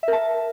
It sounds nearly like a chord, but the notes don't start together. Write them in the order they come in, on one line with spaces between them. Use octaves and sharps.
E5 A#4 A5